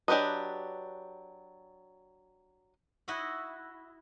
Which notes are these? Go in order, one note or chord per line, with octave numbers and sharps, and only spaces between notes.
F#3 D4 G4 B4 D#5
E4 F#4 D#5 E5 F#5